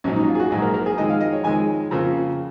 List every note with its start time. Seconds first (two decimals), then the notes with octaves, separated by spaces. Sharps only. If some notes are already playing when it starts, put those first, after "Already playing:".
0.04 A#1 G#2 F#3 C#4
0.16 D#4
0.28 F4
0.35 G#4
0.40 F#4
0.51 A#1 G#2 F#3 G#4
0.62 A#4
0.74 A#4
0.86 G#4
0.97 F2 D#3 G#3 D#5
1.10 F5
1.21 D#5
1.33 C#5
1.44 F2 D#3 G#3 G#5
1.91 F2 C#3 F3 A#3